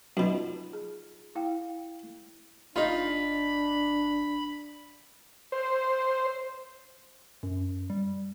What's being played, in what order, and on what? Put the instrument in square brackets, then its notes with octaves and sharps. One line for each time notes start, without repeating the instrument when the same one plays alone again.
[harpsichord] F#2 B2 [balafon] D#4 F4 B5
[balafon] G#4
E4 F5 G5
[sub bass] F#1 [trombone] D4 [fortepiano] D#4 F4 [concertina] B5
[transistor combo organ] C5
[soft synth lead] F#2
G3